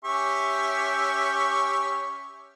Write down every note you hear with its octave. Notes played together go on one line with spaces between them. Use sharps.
C#4 G4 E5 C#6